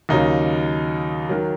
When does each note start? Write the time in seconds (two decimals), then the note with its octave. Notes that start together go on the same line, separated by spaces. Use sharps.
0.09 D#2 C#3 F#3 D#4
1.29 D#3 F#3